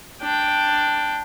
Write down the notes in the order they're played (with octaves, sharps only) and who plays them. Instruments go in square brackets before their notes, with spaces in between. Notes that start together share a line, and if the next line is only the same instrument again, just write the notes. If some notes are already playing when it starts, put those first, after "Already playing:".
[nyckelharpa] D4 G5